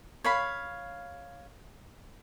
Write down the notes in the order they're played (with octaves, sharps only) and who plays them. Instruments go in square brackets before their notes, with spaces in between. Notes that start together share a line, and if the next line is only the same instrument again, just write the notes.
[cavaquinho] C#5 F5 B5